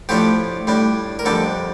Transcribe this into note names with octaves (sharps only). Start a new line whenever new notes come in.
A2 F3 A3 D4 G4
A2 G3 D4
A#4
F2 D3 G3 D4 A4